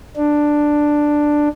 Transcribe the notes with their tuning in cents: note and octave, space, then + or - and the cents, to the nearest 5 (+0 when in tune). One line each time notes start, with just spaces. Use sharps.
D4 +5